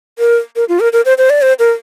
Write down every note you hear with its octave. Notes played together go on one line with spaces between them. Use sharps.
A#4
A#4
F4
A#4
A#4
C5
C5
D5
C5
A#4